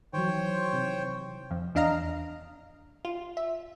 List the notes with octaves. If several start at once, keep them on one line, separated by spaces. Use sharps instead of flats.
D#3 E3 F#3 C5 C#5 G5
C3 E4
F2
E2 D4 D#5 F5 A#5 F6
F4
E5